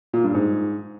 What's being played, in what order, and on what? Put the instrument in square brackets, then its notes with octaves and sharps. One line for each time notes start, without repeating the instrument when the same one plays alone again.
[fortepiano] A#2
G2
G#2